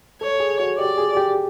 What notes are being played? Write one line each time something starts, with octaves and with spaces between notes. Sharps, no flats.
A4 C#5
G#4
F#4
G4 D5
G#4
G4